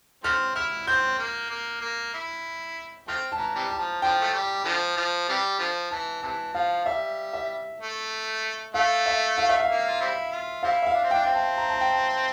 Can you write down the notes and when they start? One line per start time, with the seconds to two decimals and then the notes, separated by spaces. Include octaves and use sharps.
0.24 F3 A3 C4 F6
0.55 E4 F6
0.87 C4 G6
1.18 A#3
1.50 A#3
1.81 A#3
2.14 E4
3.08 F3 A3 C4 F6
3.32 E3 A5
3.39 A#5
3.55 C3 E3 G3
3.71 A5
3.79 F3
4.02 D3 F3 G5
4.21 A3
4.33 G3
4.65 D3 F3
4.97 F3
5.29 C3 E3 G3
5.59 D3 F3
5.91 E3 A5
6.22 C3 E3 A5
6.54 F3 F5
6.85 G3 E5
7.33 E5
7.80 A3
8.74 A3 F5
9.06 E5
9.38 F5
9.49 E5
9.60 F5
9.69 A#3
9.88 F4
10.01 G3 C4 E4
10.32 F4
10.63 G3 C4 E4 F5
10.82 E5
10.87 F5
10.94 D4
11.04 C4
11.11 D4 G5
11.23 C4 G5
11.34 A5
11.57 A#5
11.69 A5
11.81 G5
11.92 A5